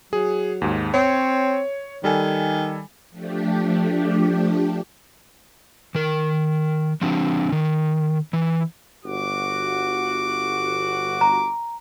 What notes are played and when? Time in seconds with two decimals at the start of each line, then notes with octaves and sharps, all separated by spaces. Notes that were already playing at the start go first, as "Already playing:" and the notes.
0.13 F#3 G#4
0.62 D#2 G#2
0.94 C4 C#5
2.04 D#3 G3 A4 G#5
3.10 F3 A3 D4 G4
5.95 D#3 A#4
7.02 F3 C4 D4
7.52 D#3
8.33 E3
9.05 G1 F#4 D6
11.21 A#5